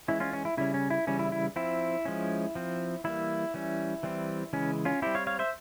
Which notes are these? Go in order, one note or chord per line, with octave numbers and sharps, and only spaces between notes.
E3 G#3 C#4 E4
C#4 F4
C#4
E4
C#3 G3 C#4 E4
C#4
E4
C#3 E3 G3 C#4
E4
E4
F3 C4 E4
F3 G#3 C#4
F3 C4
E3 G3 A#3 E4
E3 G3 C#4
E3 G3 C4
C#3 E3 G#3 C#4
C#4 F4
G3 C4 E4 G4
C#5 F5
C#5 F5
C5 E5